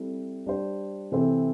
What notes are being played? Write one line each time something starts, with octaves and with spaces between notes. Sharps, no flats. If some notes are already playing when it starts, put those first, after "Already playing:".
Already playing: G3 C4 E4 A4
G3 D4 G4 C5
C3 E3 C4 A4 C5